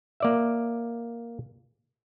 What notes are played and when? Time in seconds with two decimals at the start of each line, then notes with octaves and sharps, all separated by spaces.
0.20 A#3 D5 E5